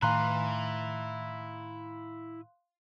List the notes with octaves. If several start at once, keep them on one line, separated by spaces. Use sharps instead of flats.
A2 D#3 E4 F5 G#5 A#5 C6 F#6